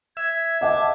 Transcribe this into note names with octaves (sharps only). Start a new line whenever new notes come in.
E5 G#6
D#5 F#5 A5 D6